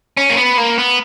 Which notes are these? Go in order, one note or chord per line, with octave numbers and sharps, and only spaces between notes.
C#4
A#3
B3
A#3
B3